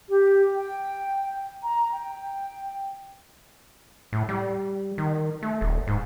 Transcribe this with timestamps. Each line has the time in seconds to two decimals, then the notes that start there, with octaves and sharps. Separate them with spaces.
0.09 G4
0.57 G5
1.63 A#5
1.93 G5
4.13 A2
4.29 G3
4.98 D#3
5.42 A3
5.61 D#1
5.87 G#2